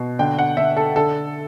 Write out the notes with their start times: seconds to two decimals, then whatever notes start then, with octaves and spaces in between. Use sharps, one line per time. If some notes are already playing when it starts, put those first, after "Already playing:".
Already playing: B2
0.19 D3 G5
0.39 F#5
0.57 D3 E5
0.77 A4
0.96 D3 A4